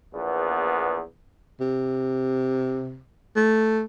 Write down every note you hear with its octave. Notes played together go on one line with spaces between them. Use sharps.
A#1 E2 B3
C3
A3